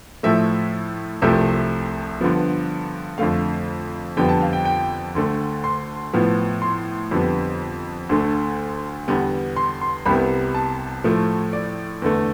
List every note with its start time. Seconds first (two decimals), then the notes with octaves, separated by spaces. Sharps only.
0.23 A2 F3 A3 E5
1.22 C2 C3 F3 A3 E5
2.21 G2 D3 F3 B3
3.18 F2 D3 A3 F5
4.17 F2 D3 G3 B3 G5
4.29 A5
4.41 F5
4.53 G5
4.65 G5
5.15 D2 D3 A3
5.64 C6
6.13 A2 F3 B3
6.62 C6
7.11 F2 D3 G3 B3
8.09 D2 D3 A3
9.08 E2 D3 G3 B3
9.56 C6
9.81 C6
10.06 C2 C3 G3 B3 B5
10.54 A5
11.04 A2 F3 A3
11.53 D5
12.02 E2 D3 A3